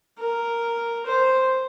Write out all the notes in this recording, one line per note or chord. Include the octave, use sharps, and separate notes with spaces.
A#4
C5